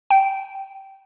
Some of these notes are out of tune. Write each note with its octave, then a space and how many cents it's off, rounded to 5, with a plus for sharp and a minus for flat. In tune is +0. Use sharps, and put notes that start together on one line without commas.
G5 -15